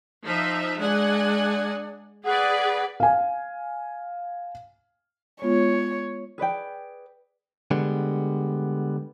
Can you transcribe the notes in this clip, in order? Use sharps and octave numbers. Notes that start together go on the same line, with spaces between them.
F3 D#4 E5
G#3 D4 F#5 G#5
G#4 B4 D5 F#5
F5 G#5
G#3 B3 F4 C#5
G#4 B4 D5 G5
D3 G3 G#3 B3